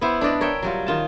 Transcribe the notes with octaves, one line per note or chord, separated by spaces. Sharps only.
B3 E4 C5
D4 B4 D5 D#5
A#4 C#5 E5 G5
F#3 G3 F4
D#3 F4 A5